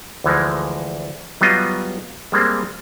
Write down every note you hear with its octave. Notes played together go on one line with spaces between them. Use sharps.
D2 E3 F3 G#3
F#3 G3 B3 F4 D#5
G3 G#3 A#3 C4